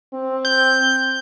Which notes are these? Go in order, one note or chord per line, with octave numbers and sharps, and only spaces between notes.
C4
G6